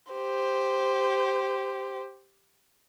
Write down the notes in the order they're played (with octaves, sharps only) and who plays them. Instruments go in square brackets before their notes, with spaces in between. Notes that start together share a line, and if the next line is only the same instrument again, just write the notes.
[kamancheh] G4 C5